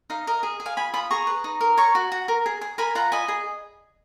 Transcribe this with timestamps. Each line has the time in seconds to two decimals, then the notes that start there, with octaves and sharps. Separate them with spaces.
0.10 D#4 F5
0.27 A#4 D#5
0.43 G#4
0.60 G#4
0.66 F5 G#5
0.77 F4 G#5 B5
0.94 F4 B5 D#6
1.11 G#4 A#5 C#6
1.27 B4
1.44 D#4
1.61 A#4
1.77 C#5 A#5 C#6
1.95 F#4
2.12 F#4
2.28 A#4
2.46 G#4
2.61 G#4
2.78 A#4 G#5 B5
2.95 F4 F#5 A#5
3.12 D#5 G#5 B5
3.28 G#4